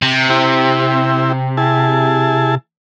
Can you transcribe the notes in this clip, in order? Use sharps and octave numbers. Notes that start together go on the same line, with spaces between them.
C3
C4 E4 G4
E4 G#4 A5